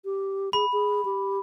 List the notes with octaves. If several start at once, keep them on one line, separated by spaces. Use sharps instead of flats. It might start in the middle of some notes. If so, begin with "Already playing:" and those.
G4
G#4 B5
G#4
G4